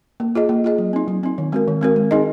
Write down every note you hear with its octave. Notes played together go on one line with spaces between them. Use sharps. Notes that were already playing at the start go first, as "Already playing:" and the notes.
A#3
F4 G#4 D#5
A#3
F4 G#4 D#5
F#3
C4 D#4
F#3
C4 D#4
D#3
G#3 C4 F#4 A#4
D#3
G#3 C4 F#4 A#4
G#3
C4 D#4 G#4 D#5